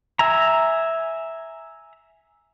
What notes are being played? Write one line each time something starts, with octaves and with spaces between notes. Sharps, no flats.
E5 G#5 A#5